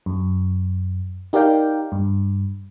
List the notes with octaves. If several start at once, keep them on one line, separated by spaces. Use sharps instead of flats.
F#2
D#4 G4 A#4 D5 F5 G5
G2